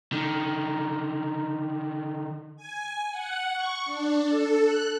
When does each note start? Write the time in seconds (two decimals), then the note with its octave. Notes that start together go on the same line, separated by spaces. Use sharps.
0.12 D3 D#3
2.56 G#5
3.11 F#5
3.52 C#6
3.86 D4
4.27 A4
4.63 F#6